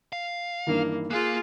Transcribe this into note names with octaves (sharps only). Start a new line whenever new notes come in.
F5
G2 D#3 E3 A#3
A#3 F4 G#4 F5 F#6